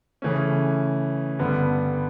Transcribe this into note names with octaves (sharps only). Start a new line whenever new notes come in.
C#3 E3 A3 C#4
G2 D3 G3 B3